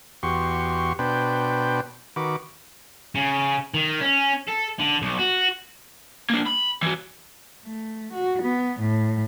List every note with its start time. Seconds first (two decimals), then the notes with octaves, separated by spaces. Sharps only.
0.23 E2 F#4 G4 C6 C#6
0.99 B2 D4 B4 C5 G5
2.16 D#3 F#4 B4 D6
3.15 C#3
3.74 D#3
4.01 C#4
4.48 A4
4.80 D3
5.02 B1
5.19 F#4
6.30 A#3 D4
6.46 B5
6.82 E3 F#4
7.65 A3
8.13 F#4
8.42 B3
8.80 A2